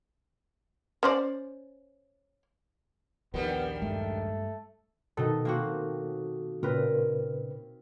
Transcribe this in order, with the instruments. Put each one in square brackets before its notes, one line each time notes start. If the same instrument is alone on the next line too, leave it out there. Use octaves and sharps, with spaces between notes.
[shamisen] C#4 C5 D5
[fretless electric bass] A#1 D#2 A#2 [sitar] D#3 G3 [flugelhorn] B3
[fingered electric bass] G2 G#3 [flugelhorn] A3
[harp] B2 D#4 [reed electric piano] D#3 A4
[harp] A#3 C4 F#4
[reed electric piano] A#2 C#3 B4 [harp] C4 A#4